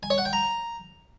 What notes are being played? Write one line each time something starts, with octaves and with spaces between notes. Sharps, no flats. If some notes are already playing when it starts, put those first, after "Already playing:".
G#5
C#5
F#5
G5
A#5